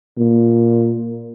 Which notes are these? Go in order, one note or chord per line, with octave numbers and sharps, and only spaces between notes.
A#2